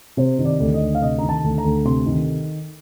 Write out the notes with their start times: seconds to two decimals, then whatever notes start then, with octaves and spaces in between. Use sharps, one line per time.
0.17 C3 C5
0.39 D#3
0.45 D5
0.60 D2
0.74 D#5
0.81 D2
0.95 F5
1.02 C3 D#5
1.19 D#3 A#5
1.29 A5
1.44 D2
1.58 A#5
1.65 D2
1.85 C3 C6
2.06 D#3